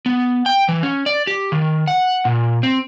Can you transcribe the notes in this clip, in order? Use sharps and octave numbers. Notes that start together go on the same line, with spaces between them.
B3
G5
E3
C#4
D5
G4
D#3
F#5
A#2
C4